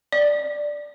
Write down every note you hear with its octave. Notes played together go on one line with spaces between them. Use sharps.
D5